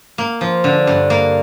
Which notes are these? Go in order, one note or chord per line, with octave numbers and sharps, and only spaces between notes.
A#3
F3
D3
G2
A#3